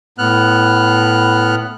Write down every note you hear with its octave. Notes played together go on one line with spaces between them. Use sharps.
A2 B3 F6 F#6